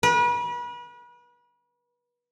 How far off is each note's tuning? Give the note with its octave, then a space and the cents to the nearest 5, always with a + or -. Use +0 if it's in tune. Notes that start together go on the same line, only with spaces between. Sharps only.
B4 -35